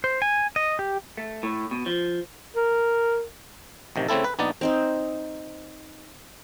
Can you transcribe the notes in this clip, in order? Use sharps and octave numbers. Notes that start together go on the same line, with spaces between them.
C5
G#5
D#5
G4
A3
A2
B2
F3
A#4
A1 C3 D#3
C#3 A3 C4 E4 A4
B4
A#1 B3 D#4 D5
C4 D#4 C5